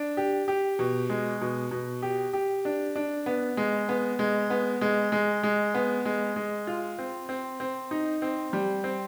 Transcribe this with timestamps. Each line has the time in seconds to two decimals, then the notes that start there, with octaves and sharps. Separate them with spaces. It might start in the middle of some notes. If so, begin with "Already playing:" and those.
Already playing: D4
0.17 G4
0.48 G4
0.79 B2
1.10 G#3
1.41 B2
1.71 B2
2.02 G4
2.33 G4
2.65 D4
2.96 D4
3.26 B3
3.57 G#3
3.89 B3
4.19 G#3
4.50 B3
4.81 G#3
5.12 G#3
5.43 G#3
5.75 B3
6.05 G#3
6.36 G#3
6.67 F4
6.99 C4
7.29 C4
7.60 C4
7.91 D#4
8.22 C4
8.53 G3
8.84 C4